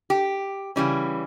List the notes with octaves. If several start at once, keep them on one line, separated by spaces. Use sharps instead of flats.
G4
C#3 E3 G3 C#4